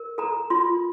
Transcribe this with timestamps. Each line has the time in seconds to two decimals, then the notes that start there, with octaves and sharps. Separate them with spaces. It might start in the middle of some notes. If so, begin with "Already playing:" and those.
Already playing: A#4
0.18 A4 A#5
0.50 F4 C6